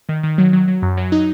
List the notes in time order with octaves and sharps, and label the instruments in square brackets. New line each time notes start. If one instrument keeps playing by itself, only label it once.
[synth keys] D#3
D#3
F#3
F#3
F#3
F#2
F#3
D#4